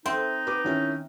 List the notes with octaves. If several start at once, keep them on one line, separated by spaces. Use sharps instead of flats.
C4 D#4 E5
B4 D6
D#3 C#4 E4